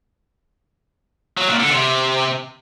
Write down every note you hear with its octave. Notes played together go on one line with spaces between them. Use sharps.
F#3
A#2
D3
C3